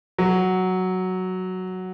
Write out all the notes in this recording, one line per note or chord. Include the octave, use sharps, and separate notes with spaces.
F#3